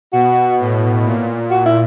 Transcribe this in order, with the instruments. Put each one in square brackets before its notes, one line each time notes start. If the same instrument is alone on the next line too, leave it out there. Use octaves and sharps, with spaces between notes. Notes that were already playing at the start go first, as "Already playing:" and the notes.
[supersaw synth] B2 [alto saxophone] F#4
[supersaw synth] A2
A#2
[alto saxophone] F#4
E4